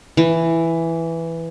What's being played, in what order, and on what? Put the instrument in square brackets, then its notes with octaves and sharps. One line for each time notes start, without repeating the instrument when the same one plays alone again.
[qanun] E3